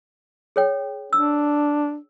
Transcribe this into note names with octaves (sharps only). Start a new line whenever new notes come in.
G#4 C#5 G5
D4 E6